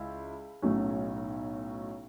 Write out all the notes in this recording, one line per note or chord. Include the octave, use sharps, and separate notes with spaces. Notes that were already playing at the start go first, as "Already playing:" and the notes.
Already playing: C#2 E4
B1 A2 F#3 A3 C#4